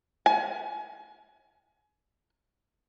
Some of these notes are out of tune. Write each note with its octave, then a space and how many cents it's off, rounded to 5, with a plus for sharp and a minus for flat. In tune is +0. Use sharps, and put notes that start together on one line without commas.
G#5 +30